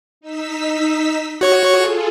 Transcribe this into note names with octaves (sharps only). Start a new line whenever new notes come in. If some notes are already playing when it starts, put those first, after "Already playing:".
D#4 E6 B6
F#4 C#5 C#6
F4 G#4 A4